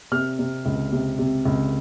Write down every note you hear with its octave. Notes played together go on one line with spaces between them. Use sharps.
C3 F6
C3
C#2
C3
C3
C#2